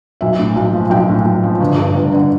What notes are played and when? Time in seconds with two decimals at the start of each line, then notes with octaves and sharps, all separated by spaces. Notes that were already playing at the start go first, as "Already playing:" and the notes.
0.21 B1 E5
0.39 A2
0.56 B1
0.73 F3
0.90 B1 G5
1.09 A2
1.25 B1
1.43 F3
1.61 G1
1.78 G2
1.95 G1
2.12 D3